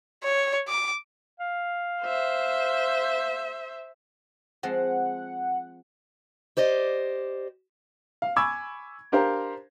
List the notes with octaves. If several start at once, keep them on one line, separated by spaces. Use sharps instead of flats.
C#5
D6
F5
C5 E5
F3 G#3 C4 F#5
G4 C5 D5 D#5
F5
G#5 B5 C#6 D6 E6 G#6
D4 G4 A#4 C5 F5 A#5